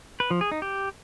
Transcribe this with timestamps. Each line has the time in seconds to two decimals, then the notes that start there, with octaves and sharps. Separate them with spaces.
0.20 B4
0.31 F3
0.41 G#4
0.52 D#4
0.62 G4